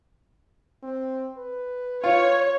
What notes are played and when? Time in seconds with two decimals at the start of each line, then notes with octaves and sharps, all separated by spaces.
0.83 C4
1.38 B4
2.04 F4 C#5